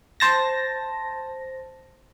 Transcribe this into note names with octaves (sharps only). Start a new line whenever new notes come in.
C5 A5 A#6